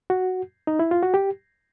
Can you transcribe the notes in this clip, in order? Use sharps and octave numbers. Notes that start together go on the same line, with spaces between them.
F#4
D#4
E4
F4
F#4
G4